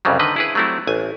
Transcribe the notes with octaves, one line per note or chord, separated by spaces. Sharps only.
C2 F2 C#3 F#3 G3
D3 D#3 B4 D#5
E4 G#4 B4
F#3 G3 A3 C4 E4
A1 G#5